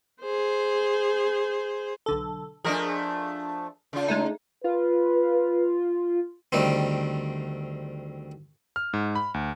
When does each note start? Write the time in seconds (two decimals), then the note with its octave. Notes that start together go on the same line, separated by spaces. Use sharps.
0.21 G#4 C5
2.06 B1 D3 A4
2.65 F3 A3 D4 G#4 A#4 D#5
3.93 C#3 F4
4.08 G#3 A3 D#4
4.64 F4 B4
6.52 D2 D#3 G3 C4
8.76 F6
8.93 G#2
9.15 B5
9.34 D2